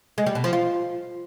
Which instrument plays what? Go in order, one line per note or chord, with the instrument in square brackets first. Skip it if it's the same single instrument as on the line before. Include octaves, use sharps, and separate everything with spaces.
[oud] G#3
G3
B2
F3
F4